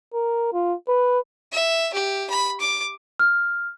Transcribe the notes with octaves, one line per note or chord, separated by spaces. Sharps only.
A#4
F4
B4
E5
G4
B5
D6
F6